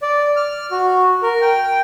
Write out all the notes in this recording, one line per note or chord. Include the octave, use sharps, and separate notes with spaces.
D5
F6
F#4
A#4
G5